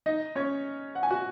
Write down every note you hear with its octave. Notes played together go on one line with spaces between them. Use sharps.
D#4 D#5
C#4 C#5
F#5
G#5
F#4 F#5